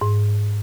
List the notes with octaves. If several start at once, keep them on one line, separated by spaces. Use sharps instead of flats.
G#2